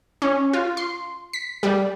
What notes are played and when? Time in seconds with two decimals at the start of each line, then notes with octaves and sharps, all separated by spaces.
0.22 C#4
0.53 F4
0.77 C6
1.33 B6
1.63 G3